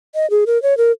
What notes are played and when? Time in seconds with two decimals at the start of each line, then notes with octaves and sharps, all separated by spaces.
0.15 D#5
0.30 G#4
0.47 A#4
0.62 C#5
0.77 A#4